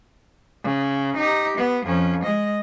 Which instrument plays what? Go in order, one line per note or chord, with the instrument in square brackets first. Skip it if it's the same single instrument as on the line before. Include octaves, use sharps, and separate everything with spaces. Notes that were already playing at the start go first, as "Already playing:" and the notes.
[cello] C#3
D#4 G4
B3
F2 C#4
G#3 D#5